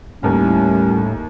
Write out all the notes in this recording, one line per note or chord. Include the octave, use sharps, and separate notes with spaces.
D#2 A2 G3 C#4 A#5